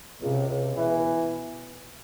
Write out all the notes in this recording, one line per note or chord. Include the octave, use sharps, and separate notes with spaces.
C#2 C3
C#2
B2 E3